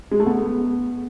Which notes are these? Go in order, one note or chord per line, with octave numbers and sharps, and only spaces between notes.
G#3
A3
B3